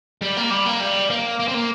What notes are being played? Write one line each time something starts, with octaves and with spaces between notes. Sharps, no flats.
G3
A#3
G3
A#3
G3
A#3
A#3
C4
A#3